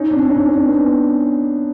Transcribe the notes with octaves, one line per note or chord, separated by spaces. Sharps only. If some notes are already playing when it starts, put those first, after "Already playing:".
Already playing: C#4 D#4
C4 D4
C#4 D#4
C4 D4
B3 C#4